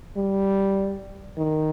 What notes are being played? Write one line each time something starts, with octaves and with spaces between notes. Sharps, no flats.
G3
D#3